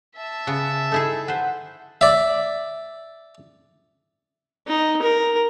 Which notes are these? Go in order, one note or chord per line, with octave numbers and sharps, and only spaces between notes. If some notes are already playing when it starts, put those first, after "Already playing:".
E5 A5
C#3 B3
D#4 E4 G#4 A4
B4 C5 F#5
D5 E5
D#4
A#4